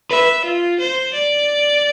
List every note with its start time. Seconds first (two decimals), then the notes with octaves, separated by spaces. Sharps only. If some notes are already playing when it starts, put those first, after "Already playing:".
0.10 B4 E5
0.45 F4
0.80 C5
1.13 D5